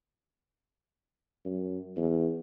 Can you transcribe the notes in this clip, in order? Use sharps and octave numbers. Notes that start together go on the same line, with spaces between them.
F#2
E2